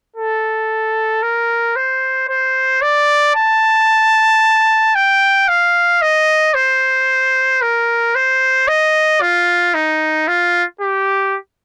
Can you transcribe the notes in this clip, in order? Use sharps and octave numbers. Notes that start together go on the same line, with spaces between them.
A4
A#4
C5
C5
D5
A5
G5
F5
D#5
C5
A#4
C5
D#5
F4
D#4
F4
G4